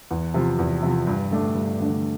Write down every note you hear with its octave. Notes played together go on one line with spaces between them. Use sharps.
E2
C3 F3
E2
C3 F3
G2
D3 A3 D4
G2
D3 A3 D4